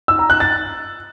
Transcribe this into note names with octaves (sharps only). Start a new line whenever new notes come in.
E6
A#5
F#6
A6